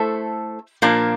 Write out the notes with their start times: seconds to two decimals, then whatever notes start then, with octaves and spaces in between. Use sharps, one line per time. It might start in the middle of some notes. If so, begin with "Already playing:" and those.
Already playing: A3 E4 A4 C5
0.82 A#2 F3 A#3 D4